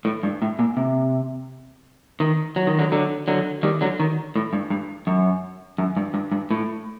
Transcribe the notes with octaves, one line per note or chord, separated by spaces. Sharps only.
A2
G2
A2
A#2
C3
D#3
F#3
D#3
D3 F#3
D3 F#3
D3 F#3
D#3 G3
D3 F#3
D#3
A2
G2
G2
F#2
F#2
G2
G2
G2
A2